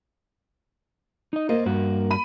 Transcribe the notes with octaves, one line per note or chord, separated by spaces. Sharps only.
D#4 D#5
A#3 C5 D#5
G2 F#4
B5 D#7